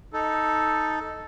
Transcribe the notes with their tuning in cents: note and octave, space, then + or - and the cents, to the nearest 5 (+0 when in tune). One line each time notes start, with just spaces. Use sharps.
D#4 +5 A4 +0